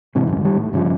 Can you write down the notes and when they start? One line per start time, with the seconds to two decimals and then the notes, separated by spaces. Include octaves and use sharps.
0.15 G#2 C3 E3
0.27 G#1 C#2 F#2
0.41 D#3 G3
0.57 A2
0.73 G2 C#3 E3 F3